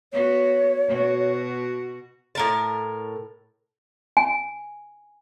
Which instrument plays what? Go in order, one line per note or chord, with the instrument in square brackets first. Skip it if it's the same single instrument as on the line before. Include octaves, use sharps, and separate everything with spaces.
[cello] B3 F#4 [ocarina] C#5
[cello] B2 F#4
[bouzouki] A2 A#4 A5
[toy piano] G#5